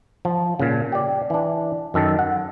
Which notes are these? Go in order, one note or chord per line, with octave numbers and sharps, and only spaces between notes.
F3
A#2 C#3
G4 D5
E3 D4
F#2 D#3 A4
F#5